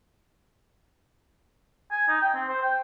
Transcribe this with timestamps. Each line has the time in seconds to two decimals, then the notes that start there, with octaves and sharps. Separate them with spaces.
1.91 G#5
2.08 D#4
2.22 G5
2.34 C4
2.48 C5
2.62 G5